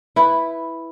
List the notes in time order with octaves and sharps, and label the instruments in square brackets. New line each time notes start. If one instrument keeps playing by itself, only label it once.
[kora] E4 B4